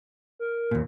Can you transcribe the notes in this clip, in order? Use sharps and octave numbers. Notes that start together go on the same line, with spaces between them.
A#4
D#2 A#2